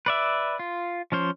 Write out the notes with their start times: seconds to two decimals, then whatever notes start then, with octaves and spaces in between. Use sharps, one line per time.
0.06 B4 D5 E5
0.59 F4
1.12 F3 C#4 C5